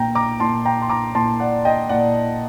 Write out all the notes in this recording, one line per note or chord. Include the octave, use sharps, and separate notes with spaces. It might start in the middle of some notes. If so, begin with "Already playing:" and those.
Already playing: A#2 G5 A#5
A#5 D6
A#2 A5 C6
G5 A#5
C6
A#5 D6
A#2 A5 C6
D5 F#5
D#5 G5
A#2 D5 F#5